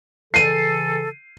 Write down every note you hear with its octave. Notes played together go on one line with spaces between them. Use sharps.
C#3 E3 A4 C7 D#7